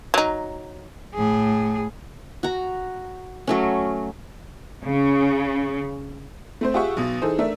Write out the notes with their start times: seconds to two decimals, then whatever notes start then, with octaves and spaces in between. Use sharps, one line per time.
0.14 F#3 D#4
1.15 A2 G#4
2.43 F#4 A#5
3.47 F#3 A3 C#4
4.85 C#3
6.61 A3 C4 C5
6.74 F4 G4 G#4 E5 F#5 C#6
6.97 B1 B2
7.22 E3 D#4 G#4 A4 C5
7.39 A3 D4 A#4 E5